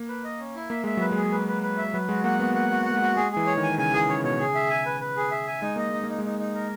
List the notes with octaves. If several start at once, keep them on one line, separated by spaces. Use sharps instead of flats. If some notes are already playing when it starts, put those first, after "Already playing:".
Already playing: A#3
B4
D#5
C#4
E4
A#3 E5
G#3 E5
F#3 B4
G#3 G#4
B4
B4
B4
E5
F#3 B4
G#3 F#4
A#3 F#5
B3 F#4
A#3 F#5
F#4
A#3 F#5
G#3
F#4
G#3 G#4
E3 G#4
C#5
D#3
G#5
C#3 G#5
E3 G#4
C#3 C#5
B2 C#5
C#3 G#4
E5
G#5
B4
B4
G#4
E5
G#5
G#3 D#4
A#3 D#5
G#3 D#4
A#3
D#4
G#3
D#4
D#4
A#4